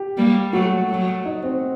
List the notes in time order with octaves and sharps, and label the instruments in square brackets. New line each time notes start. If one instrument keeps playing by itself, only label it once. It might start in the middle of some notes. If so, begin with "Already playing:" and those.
Already playing: [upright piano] G4
[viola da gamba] G3 A#3
[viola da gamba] F#3 A3 [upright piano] F#4
[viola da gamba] F#3 A3
[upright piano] D#4
C4